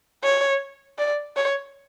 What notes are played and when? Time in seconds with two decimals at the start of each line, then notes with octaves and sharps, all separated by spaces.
0.23 C#5
0.98 D5
1.36 C#5